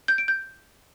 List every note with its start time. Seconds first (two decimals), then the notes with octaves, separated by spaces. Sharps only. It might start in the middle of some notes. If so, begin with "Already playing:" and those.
0.08 G6
0.18 D7
0.28 G6